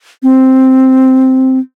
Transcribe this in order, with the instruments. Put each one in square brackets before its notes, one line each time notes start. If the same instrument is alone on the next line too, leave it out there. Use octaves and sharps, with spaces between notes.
[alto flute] C4